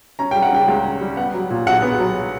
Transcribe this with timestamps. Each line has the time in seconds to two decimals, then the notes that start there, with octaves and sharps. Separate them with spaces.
0.19 C#4 A#5
0.31 G3 G5
0.43 F#5
0.52 C#3 G5
0.68 C#2
0.85 C#4
1.01 G3
1.17 B3 F#5
1.34 F#3
1.50 A#2
1.67 B1 F#5
1.82 B3
1.99 F#3